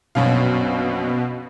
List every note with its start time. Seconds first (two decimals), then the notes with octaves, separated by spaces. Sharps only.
0.15 A#1 F#2 B2 F5